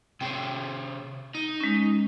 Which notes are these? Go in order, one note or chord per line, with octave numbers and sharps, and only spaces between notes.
C3 C4 G#4 G5
D#4
G#3 C#4